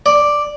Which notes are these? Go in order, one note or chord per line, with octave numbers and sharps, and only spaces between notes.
D5